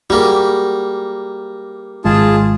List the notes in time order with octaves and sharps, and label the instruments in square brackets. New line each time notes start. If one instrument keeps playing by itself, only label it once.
[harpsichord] G3 A#3 [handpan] F#4 G#4
[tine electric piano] G#1 [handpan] G#3 [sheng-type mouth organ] F4 G#4 A5